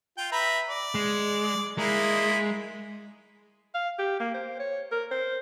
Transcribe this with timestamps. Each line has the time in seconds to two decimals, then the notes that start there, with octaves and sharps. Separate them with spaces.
0.18 F4 G5
0.32 B4 E5 A#5
0.70 D5
0.95 G#3
1.78 G#3 A#3 D#4 E4
3.74 F5
3.99 G4
4.20 A#3
4.34 C5
4.59 C#5
4.92 A#4
5.11 C5